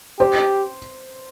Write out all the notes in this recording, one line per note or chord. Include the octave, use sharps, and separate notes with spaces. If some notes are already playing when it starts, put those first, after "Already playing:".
G4 C5